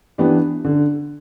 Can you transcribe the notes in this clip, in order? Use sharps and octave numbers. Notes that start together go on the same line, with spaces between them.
E3 B3 D4 G4
D3